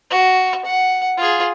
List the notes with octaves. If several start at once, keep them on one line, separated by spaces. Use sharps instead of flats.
F#4
F#5
F4 G#4